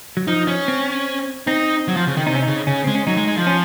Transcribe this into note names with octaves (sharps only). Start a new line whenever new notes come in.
F#3
F3 D#4
C#4
C4
C4 D#4
F#3
F3
C#3
D#3
C3 D#4
C#4
C#3 D#4
C#3 C#4
G#3 C4
C#4
F#3 D#4
G#3
G#3
F3
C#4